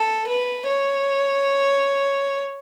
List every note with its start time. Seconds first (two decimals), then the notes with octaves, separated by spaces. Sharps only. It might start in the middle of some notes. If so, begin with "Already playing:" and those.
Already playing: A4
0.27 B4
0.67 C#5